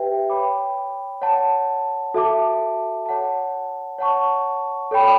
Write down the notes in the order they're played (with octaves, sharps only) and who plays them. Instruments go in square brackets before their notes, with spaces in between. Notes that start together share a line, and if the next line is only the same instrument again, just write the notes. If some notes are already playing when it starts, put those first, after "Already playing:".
Already playing: [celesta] G4 B4 E5 G5
C#5 G5 B5 D6
C#5 F#5 A5
F#4 A4 E5 A5 D6
C#5 F#5 A5
C#5 F#5 A5 C#6
A4 C#5 G5 B5